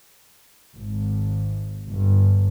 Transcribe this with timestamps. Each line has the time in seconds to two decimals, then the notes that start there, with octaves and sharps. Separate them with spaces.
0.76 G#1
1.90 G1